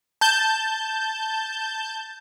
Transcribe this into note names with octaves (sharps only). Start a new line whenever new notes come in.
A5 G6